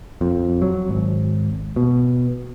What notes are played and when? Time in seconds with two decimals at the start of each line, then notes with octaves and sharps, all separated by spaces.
0.21 F2
0.62 F#3
0.89 G#1
1.76 B2